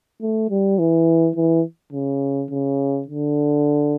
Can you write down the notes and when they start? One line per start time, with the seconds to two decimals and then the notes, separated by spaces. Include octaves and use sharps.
0.21 A3
0.50 G3
0.79 E3
1.36 E3
1.93 C#3
2.51 C#3
3.08 D3